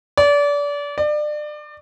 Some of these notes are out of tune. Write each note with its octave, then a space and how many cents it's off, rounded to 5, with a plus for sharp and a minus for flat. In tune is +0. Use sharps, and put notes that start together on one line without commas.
D5 -30
D5 +30